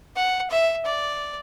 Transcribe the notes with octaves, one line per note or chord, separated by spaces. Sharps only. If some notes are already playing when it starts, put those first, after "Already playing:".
F#5
E5
D5